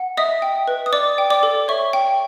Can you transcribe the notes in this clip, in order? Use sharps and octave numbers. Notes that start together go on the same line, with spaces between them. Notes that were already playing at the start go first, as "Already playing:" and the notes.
Already playing: F#5
D#5 E5 D#6
G5
B4
D#6
D5 D6
G5
D5 D6
A4
C#5 E5 C#6
G5